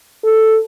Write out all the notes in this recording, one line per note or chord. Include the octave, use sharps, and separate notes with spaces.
A4